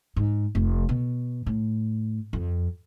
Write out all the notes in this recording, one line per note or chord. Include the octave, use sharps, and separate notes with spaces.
G#2
F1
B2
A2
F2